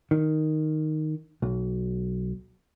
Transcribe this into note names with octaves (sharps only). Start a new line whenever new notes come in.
D#3
B1